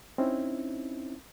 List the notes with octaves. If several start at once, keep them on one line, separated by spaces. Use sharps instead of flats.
C4 C#4 D#4 E4